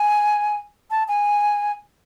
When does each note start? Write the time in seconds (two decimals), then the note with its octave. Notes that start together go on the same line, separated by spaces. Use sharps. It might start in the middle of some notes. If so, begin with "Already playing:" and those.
Already playing: G#5
0.91 A5
1.08 G#5